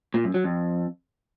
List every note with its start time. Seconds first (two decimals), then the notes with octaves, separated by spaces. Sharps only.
0.14 A#2
0.24 F#2
0.34 F#3
0.44 F2